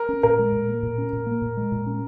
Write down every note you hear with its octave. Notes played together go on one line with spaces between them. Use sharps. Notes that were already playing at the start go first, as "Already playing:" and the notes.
Already playing: A#4
C#4
A#2 A#4
G#3
A#2
A#3
A#2
C#4
A#2
A#3
A#2
G#3
A#2
C#4